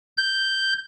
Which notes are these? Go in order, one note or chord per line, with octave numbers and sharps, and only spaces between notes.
G6